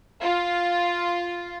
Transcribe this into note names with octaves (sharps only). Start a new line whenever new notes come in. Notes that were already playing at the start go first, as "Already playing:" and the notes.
F4